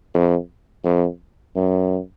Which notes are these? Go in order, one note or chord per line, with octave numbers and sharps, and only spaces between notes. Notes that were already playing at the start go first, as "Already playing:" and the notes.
F2
F2
F#2